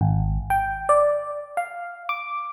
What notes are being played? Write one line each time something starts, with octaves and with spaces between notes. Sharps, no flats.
G#1
G5
D5
F5
D6